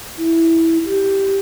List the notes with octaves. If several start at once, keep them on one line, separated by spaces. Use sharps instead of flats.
E4
G4